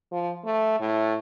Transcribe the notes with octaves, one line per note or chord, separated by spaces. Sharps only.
F3
A3
A2